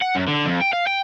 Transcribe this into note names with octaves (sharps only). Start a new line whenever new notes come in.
F#5
F#2
D3
F2
G5
F5
G5